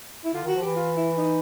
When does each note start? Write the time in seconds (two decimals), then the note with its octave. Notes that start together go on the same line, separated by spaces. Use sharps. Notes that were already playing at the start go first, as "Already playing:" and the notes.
0.25 E4
0.33 D3 F4
0.44 D#3 F#4
0.55 F3
0.62 E3 G4
0.76 F4
0.96 E4
1.18 D#4